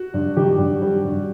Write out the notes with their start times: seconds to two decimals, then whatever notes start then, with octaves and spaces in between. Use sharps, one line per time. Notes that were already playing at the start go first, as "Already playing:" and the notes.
Already playing: F#4
0.14 G2
0.37 D#3 G4
0.58 G2
0.82 G3
1.05 G2